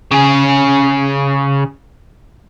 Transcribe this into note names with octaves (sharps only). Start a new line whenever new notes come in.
C#3 G#4